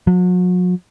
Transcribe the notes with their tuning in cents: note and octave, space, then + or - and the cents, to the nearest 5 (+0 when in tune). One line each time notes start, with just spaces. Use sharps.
F#3 -40